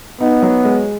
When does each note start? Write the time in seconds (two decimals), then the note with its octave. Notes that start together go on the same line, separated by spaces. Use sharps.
0.20 B3 D#4
0.42 F#3
0.64 G#3